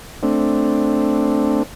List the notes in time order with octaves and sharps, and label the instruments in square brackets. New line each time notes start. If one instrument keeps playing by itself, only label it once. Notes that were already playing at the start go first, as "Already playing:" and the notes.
[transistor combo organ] A3 C4 D4